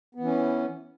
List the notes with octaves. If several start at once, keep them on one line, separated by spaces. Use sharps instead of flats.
E3 B3 C#4